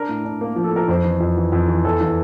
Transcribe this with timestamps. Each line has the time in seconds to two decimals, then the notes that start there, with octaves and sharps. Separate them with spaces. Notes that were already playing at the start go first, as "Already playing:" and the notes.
Already playing: D4 A#4
0.09 A2
0.24 D4
0.41 A#3
0.56 F3
0.64 A4
0.73 F3 A#4
0.88 F2 C5
1.04 E3
1.20 F2
1.37 E3
1.52 F2
1.68 E3
1.85 E2 A4
2.01 E3